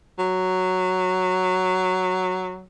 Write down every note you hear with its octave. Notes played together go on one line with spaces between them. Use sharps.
F#3